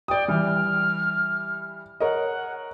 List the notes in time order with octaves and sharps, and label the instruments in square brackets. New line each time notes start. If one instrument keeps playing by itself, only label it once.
[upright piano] D5 D#6 [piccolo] G5
[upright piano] E3 G3 [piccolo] F6
[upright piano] A#4 C#5 D#5 [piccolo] F#5